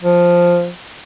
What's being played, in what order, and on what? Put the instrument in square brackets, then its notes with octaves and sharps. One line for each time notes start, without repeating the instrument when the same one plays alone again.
[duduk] F3